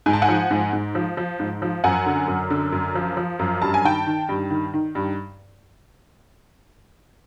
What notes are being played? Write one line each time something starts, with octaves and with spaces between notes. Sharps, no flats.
G#2 G#5
A5
F#5 G#5
F3
G#2
G#2
F3
F3
G#2
F3
F#2 F#5 G#5
D3
F#2
D3
F#2
F3
F3
F#2
G2 A5
G#5
D#3 G5 A5
D#3
G2
D#3
D#3
G2